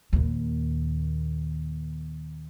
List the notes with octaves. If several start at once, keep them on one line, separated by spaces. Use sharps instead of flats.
D#2 A#2